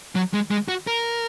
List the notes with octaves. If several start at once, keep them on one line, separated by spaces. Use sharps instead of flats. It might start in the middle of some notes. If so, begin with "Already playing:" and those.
F#3
G#3
G#3
F#4
A#4